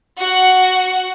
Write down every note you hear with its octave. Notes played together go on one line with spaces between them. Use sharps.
F#4 F#5